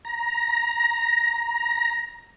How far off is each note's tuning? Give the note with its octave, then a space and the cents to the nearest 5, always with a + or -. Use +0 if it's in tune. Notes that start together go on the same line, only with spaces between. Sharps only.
A#5 +15